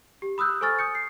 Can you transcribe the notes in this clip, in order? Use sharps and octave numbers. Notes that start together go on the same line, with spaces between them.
G4
B5 D#6 E6 F#6 G6
A4 C5 G#5 C#6 F6 A6
D#6 G6 C#7
C7